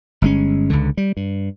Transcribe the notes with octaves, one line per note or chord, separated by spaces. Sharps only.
G1 G#3 C#4
C#2 D3
G3
G2